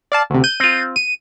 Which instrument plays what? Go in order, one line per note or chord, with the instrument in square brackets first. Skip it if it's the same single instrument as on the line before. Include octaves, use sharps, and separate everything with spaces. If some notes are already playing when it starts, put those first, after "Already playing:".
[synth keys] D5 F5 A5
D2 C3
G6 D#7
[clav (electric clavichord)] C4 F4
[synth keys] D#7